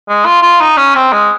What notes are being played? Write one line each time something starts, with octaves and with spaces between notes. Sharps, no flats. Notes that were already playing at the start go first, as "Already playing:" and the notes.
G#3
F4
F4
D#4
C#4
C4
G#3